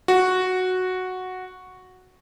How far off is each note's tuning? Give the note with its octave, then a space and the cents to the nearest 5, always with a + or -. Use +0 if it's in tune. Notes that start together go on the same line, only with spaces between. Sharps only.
F#4 -5